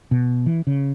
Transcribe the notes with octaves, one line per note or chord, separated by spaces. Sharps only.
B2
E3
C#3